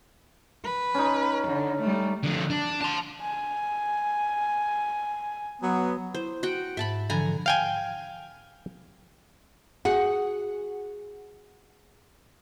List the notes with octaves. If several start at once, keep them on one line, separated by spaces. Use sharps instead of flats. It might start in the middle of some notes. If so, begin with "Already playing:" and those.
B4
C#4 D#4
D3
G3 A3
F2 D3
D4
A5 C6
G#5
F#3 B3
E4 C5
F#4 F#5 G5
G#2 E5 A5 B5
D3 E3 F3 G#5 A#5 B5
F5 G5 G#5
F#4 G#4 F#5